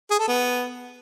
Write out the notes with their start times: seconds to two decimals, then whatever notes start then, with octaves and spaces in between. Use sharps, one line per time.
0.10 G#4
0.19 A4
0.28 B3